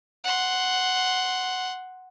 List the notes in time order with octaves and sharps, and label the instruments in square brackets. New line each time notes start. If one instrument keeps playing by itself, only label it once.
[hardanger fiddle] F#5 C6